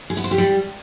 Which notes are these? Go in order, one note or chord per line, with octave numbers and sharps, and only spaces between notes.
G#4
B3
C5
G4
G3